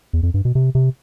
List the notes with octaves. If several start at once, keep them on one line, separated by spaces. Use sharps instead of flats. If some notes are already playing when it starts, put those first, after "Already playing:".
E2
F2
G2
B2
C3
C3